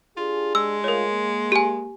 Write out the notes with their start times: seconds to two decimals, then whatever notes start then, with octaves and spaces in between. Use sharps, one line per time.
0.17 D4 F4 G4 G#4
0.55 G#3 E6
0.84 A3 F4 A#4 C#5
1.13 A#3
1.52 G4 G#5